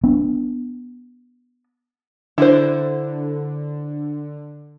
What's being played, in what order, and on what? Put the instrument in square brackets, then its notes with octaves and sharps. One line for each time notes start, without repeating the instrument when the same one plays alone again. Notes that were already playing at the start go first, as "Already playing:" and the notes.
[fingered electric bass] B3 D4
[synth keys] D3 [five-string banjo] E4 C5